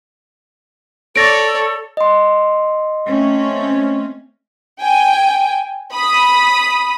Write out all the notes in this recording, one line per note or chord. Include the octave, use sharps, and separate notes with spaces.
A4 C#5 D5 A6 A#6 D7
D#5 C6
A3 C4 C#4
G5 G#5
B5 D#6